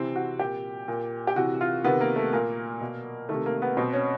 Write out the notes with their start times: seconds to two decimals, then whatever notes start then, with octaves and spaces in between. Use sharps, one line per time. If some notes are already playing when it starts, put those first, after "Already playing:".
Already playing: C3 E3 C4
0.16 F#4
0.39 A#2 G4
0.88 A#2
1.27 G4
1.36 C3 E3 F#4
1.61 F4
1.84 C3 D#3 B3
2.01 A#3
2.16 A3
2.33 A#2 A#3
2.81 B2
3.29 C3 D#3 A3
3.46 A#3
3.62 B3
3.77 B2 C4
3.93 C#4